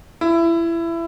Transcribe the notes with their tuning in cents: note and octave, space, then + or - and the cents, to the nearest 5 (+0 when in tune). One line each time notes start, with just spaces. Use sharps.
E4 +25